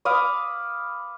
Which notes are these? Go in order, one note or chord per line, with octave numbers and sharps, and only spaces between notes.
F5 B5 D6 D#6